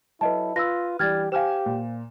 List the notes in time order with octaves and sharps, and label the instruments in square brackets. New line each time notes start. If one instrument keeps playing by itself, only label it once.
[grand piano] F#3 A4 [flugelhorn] E4 [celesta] B4 D#5 A5
[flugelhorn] F4 [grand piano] B4 [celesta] E6 A#6
[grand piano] E3 G3 D4 [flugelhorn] G4 [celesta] F6 G#6 A6
[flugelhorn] G4 [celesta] C5 F5 [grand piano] G#5 F6 E7
[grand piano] A#2